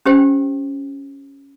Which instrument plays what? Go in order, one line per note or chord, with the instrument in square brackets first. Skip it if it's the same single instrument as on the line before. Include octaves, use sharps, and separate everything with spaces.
[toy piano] C#4 G4 C5 G5